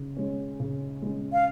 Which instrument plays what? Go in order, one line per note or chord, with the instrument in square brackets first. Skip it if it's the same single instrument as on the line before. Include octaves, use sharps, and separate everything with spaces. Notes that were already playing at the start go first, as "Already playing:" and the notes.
Already playing: [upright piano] C#3
G#3 C#4
C#3
G#3 C#4
[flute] F5